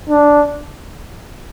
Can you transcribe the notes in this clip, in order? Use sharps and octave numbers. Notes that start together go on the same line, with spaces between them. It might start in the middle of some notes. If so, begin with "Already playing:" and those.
D4